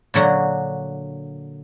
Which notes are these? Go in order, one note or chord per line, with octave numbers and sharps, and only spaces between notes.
A#2 D3 F#3 F#4